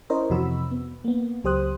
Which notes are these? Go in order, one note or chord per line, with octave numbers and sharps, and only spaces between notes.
C#4 E4 A#4 C5 C#5 D#5
F2 C3 E3 F#4 B5 E6
B3
A#3 B3
C#2 F#3 G4 C5 D#6 F#6